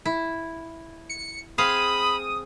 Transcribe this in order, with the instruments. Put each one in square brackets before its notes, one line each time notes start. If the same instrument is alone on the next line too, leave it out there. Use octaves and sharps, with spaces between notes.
[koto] E4
[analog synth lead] C#7
[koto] C4 G#4 F5 [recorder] B5 [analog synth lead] D#6